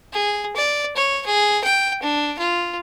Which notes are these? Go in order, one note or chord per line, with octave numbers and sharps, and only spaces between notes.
G#4
D5
C#5
G#4
G5
D4
F4